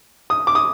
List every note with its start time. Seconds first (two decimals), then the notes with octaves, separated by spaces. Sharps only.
0.30 D#6
0.47 D6
0.55 D#6